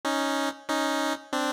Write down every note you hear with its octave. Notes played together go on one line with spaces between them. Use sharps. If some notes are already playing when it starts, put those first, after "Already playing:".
C#4 D#4
C#4 D#4
C4 D4